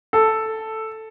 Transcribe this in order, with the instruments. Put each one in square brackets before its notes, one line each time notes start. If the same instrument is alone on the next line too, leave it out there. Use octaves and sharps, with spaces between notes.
[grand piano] A4